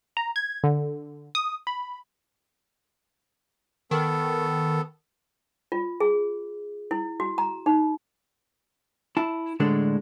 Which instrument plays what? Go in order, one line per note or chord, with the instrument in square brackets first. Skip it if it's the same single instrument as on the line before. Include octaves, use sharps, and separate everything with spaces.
[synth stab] A#5
G#6
D3
D#6
B5
[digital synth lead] D#3 [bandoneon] B3 A4
[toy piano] F4
G#4
E4
F#4
A#5
D#4
[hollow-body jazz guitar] E4 A5
A2 D3 G#3 D4 A4